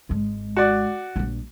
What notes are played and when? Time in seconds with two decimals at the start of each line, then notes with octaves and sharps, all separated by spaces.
0.09 G#1 G#3
0.57 F#4 D5
1.16 A#1 G3